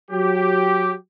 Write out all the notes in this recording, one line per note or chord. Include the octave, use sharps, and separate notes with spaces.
F#3 G4